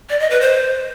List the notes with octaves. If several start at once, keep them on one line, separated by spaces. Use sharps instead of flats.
D5
D#5
B4
C5